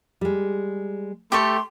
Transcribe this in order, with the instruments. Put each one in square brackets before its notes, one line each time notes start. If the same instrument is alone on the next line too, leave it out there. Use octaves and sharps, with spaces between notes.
[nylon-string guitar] G3 G#3
[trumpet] A3 [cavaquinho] G4 A4 C#6 [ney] C6